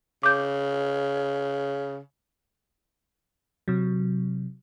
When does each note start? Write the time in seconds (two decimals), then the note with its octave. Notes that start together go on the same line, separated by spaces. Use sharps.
0.23 C#3 D6 G6
3.68 C3 F#3